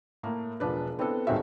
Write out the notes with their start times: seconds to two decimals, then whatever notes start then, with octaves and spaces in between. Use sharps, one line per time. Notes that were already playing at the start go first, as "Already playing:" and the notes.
0.23 A2 A3 A#3
0.60 E1 F3 D4 B4
0.99 B3 C4 D4 E4 A4
1.27 D#1 C#2 D#3 C4 F#4 E5